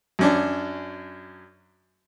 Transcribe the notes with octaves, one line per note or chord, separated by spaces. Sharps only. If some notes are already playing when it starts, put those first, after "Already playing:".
F#2 C#4 D4